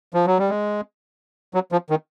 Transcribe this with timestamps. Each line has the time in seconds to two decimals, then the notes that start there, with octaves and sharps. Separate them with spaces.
0.14 F3
0.26 F#3
0.39 G3
0.50 G#3
1.54 F#3
1.72 F3
1.90 D#3